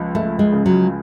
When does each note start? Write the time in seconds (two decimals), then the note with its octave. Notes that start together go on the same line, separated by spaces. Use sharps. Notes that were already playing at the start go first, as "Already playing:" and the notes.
Already playing: C#2 F3
0.15 C#2 A3
0.39 G#3
0.52 C#3
0.66 F#3